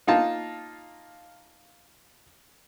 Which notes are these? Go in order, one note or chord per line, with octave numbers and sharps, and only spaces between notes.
A#3 D#4 F4 A5